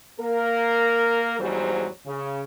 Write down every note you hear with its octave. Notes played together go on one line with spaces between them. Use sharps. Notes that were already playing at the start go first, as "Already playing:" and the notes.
A#3 A#4
E2 G#2 F#3 G3 C5
C#3